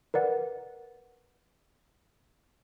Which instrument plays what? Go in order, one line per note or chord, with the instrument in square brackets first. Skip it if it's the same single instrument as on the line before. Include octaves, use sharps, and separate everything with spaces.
[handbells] A#4 B4 D5 F#5